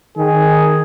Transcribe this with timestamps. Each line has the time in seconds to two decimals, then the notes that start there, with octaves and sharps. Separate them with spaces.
0.17 D#3 G#4